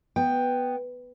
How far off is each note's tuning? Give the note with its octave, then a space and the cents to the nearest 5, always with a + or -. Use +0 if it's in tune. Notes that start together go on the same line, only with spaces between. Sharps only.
B3 +0 G5 +10